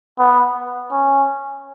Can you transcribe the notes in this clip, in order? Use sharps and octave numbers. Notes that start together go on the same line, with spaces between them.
B3
C#4